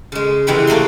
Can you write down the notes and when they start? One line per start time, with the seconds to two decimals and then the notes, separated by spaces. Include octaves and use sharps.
0.12 C#3 G#3
0.47 C3 E3 G#3 F#5 G5 B5
0.67 A3 A#3 A#4 C6